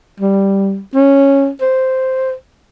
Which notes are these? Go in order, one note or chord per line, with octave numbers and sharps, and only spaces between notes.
G3
C#4
C5